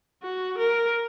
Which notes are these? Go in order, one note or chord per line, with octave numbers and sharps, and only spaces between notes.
F#4
A#4